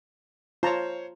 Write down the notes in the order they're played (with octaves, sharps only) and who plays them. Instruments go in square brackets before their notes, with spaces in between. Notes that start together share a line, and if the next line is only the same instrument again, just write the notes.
[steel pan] F4 A5 A#5 [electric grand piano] C5 C#5